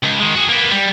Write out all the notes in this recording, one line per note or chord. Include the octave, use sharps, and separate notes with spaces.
C#2
D#3 G#3
F#4 G#4
A#3 B3
G3